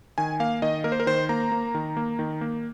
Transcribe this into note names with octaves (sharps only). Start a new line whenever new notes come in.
D#3 G#5
A#3 F5
D#3 D#5
A#3 A#4
C5
A#4
D#3 C5
A#3 A#5
A#3
D#3
A#3
D#3
A#3